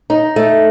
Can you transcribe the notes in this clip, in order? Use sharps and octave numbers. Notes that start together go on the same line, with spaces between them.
D#4
A3